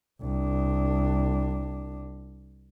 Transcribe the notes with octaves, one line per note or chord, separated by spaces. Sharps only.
C2 D4